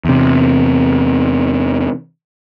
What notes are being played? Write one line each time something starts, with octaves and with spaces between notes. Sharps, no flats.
E2 C3